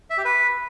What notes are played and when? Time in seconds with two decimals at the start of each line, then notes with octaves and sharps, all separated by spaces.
0.10 E5
0.18 G4
0.25 B4